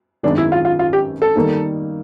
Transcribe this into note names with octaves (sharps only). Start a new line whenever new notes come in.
G#1 F#2 D#3 G#3 B3 D4
E4
F4
F4
F4
G4
A4
D#3 G3 A#3 D#4